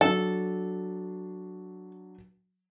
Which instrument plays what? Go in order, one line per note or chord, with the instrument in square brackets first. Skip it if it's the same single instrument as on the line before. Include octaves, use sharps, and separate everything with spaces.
[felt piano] F#3 D4 [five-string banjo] A4